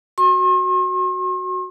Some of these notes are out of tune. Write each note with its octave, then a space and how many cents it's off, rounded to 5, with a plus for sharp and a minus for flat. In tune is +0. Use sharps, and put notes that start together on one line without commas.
F#4 +0 C6 +45